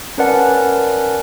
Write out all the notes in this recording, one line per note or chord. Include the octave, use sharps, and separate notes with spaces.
C#4 A#4 B4 D5 F#5 A5